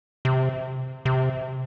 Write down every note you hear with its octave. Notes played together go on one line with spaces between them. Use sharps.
C3
C3